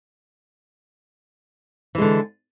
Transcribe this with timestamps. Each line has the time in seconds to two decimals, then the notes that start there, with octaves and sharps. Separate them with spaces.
1.95 E3
1.98 G#3
2.02 D3